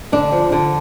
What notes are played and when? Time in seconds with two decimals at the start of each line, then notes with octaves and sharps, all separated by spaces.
0.12 D3 D4
0.32 F3
0.52 D3